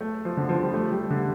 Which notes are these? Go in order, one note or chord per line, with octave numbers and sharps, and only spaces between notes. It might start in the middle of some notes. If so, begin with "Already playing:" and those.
A3
F3
D3
F3
G3
A3
G3
D3